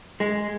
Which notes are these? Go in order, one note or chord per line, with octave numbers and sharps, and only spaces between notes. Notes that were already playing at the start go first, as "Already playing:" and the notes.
G#3